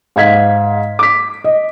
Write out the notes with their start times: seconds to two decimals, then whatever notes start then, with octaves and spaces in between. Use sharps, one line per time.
0.16 G#2 F5 G#6 B6
0.99 D6 B6
1.44 D#5